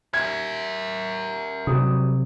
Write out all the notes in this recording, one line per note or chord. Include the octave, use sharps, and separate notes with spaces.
A#4 E5 G#6
C3 F#3 G3 D#6